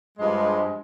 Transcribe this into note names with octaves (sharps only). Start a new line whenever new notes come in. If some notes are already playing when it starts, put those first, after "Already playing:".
G2 F3 G#3